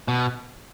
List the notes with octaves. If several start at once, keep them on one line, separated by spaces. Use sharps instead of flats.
B2